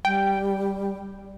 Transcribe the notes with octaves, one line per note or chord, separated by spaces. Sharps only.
G3 G5